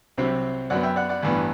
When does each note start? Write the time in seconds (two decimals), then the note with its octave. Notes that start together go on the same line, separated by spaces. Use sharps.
0.17 C2 C3 F#3 C4 C5 E5
0.70 F#2 F#3 B3 D5 F#5
0.83 E5 G5
0.96 D5 F#5
1.09 D5 F#5
1.23 A1 G2 E3 B3